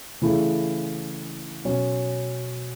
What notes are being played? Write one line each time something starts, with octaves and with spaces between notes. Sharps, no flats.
C#3 E3 A3 E4
B2 F#3 C#4